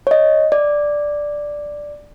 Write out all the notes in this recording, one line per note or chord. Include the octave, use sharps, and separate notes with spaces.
C#5 D#5
D5